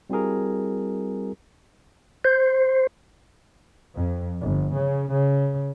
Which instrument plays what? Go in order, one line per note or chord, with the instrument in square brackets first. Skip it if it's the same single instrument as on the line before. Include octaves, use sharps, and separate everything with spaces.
[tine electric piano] G3 C4 E4 F#4 G#4 A#4
[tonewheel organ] C5
[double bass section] F2
G1
C#3
C#3